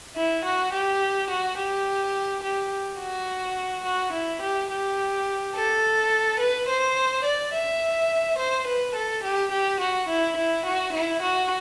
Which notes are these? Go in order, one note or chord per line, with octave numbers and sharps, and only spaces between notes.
E4
F#4
G4
F#4
G4
G4
F#4
F#4
E4
G4
G4
A4
B4
C5
D5
E5
C5
B4
A4
G4
G4
F#4
E4
E4
F#4
E4
F#4